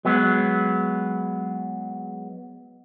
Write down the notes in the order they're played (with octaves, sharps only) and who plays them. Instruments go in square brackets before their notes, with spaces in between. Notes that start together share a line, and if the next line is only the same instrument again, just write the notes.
[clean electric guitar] F#3 G#3 B3